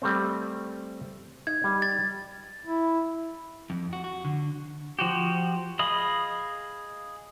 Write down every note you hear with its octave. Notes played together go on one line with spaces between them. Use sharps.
G3 A3 C4
D#4 G#6
G3
A6
E4
F2
F#4
F#4
D3
F3 F#4 G4
G#4 D#5 F5 B5 D#6